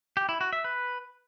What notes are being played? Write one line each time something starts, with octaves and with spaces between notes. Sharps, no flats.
G4
E4
F#4
E5
B4